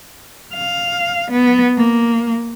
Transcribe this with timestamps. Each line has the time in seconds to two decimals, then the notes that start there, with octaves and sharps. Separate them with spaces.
0.53 F5
1.31 B3
1.77 A#3